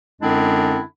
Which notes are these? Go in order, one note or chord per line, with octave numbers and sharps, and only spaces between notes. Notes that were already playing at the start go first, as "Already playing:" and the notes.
F#2 D3 G#3 C4 D4 E4